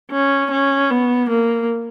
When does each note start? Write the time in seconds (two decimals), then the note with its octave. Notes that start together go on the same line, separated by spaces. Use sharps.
0.11 C#4
0.51 C#4
0.90 B3
1.30 A#3